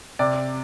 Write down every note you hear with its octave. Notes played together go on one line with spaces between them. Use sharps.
C3 D5